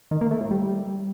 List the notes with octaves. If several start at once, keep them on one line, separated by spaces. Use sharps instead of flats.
D#3
A#3
A3
A2
G3